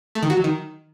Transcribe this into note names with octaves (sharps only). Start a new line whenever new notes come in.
A3
D#3
F#4
F#3
D#3